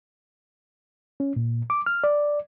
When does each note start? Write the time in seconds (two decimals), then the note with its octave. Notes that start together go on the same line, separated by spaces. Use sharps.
1.20 C#4
1.36 A#2
1.70 D6
1.86 F6
2.04 D5